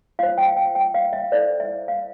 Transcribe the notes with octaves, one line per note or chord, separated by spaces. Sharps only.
F4 C5 F5
G5
G5
G5
F5
E5
E4 A4 C5 D5
E5
F5